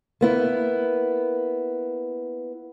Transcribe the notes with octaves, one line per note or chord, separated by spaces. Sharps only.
A#3 B3 E4